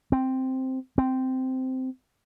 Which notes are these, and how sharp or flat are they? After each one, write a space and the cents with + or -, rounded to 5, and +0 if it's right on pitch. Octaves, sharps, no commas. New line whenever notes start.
C4 +0
C4 -10